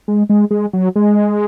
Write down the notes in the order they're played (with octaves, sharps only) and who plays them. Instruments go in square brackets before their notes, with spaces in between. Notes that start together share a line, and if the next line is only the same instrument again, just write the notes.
[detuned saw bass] G#3
G#3
G#3
F#3
G#3